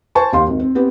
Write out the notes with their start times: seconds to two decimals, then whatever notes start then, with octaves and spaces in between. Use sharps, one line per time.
0.15 C5 G#5 A5 C#6
0.33 D#2 G4 F5 C6
0.47 G#1
0.60 C4
0.75 B3 C4 G4